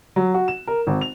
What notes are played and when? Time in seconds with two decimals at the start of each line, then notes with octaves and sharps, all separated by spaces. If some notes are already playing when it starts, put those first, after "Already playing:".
0.16 F#3
0.34 F#4
0.48 E7
0.67 A#4
0.87 G#1
1.01 F7